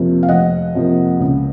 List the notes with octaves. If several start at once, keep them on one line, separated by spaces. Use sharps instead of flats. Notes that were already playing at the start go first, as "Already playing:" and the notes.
Already playing: F2 C3 F3 A#3
F5
F1 D#5 F#5
F2 C3 F3 A#3
C#2